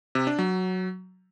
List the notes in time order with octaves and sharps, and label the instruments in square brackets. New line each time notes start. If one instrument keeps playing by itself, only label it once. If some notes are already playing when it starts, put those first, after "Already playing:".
[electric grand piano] C3
D4
F#3